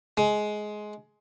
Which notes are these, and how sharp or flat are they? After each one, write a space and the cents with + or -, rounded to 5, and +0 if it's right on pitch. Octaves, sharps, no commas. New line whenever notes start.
G#3 +15